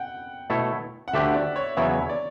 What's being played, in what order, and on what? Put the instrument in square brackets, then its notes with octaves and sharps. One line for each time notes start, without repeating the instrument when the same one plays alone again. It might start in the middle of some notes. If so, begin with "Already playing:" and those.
Already playing: [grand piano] F#5 G5
[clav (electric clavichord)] B2 A3 E4 A4 C#5
[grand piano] F#5
[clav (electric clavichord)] D2 D3 A3 D4 G4 [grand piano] E5
[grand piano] D5
C#5
[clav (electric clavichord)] E2 C#3 F#3 B3 E4 [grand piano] C#5
[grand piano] D5